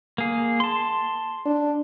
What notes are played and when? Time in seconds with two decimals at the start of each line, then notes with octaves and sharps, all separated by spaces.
0.18 A#3 G#4
0.60 A5 C6
1.46 D4